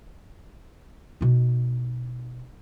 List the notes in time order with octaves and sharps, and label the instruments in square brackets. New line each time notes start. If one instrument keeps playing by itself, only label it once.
[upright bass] B2 D#4